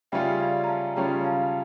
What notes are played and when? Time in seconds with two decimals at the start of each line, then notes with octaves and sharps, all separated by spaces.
0.12 C#3 G3 C#4 F4 C#5 E5 G5
0.40 D5 F5
0.64 A#5
0.68 F5 A5
0.96 C#3 G3 C#4 F4 C#5 G5 A#5
1.25 F5 A5